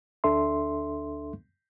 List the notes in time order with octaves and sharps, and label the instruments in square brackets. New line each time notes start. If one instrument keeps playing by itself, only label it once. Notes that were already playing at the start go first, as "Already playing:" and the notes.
[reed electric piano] D2 D4 A4 E5 C6